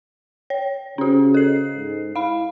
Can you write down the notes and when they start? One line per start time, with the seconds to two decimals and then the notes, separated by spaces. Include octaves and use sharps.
0.50 C#5
0.98 C#3 C#4 F#4
1.34 A4 C7
1.76 G#2
2.16 E4 F5 B5